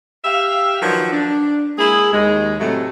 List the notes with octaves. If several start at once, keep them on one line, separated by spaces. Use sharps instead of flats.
G4 E5 F5
D#3 F3 F#3 D4 F#4 B4
D4
G#3 A#3 E4 G#4
D#2 G#3
A2 C3 F#3 A3